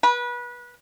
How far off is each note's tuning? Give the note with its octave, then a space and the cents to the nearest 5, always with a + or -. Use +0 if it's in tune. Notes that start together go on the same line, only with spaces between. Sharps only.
B4 -25